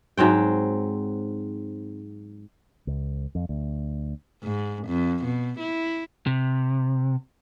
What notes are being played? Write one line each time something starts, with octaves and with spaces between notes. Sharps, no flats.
G#2 F#3 C4 G5
C#2
F2
D2
G#2
F2
B2
E4
C3